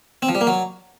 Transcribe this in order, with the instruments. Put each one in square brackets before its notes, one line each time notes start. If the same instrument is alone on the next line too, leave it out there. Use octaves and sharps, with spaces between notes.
[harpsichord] C4
F3
G3
A#3
F#3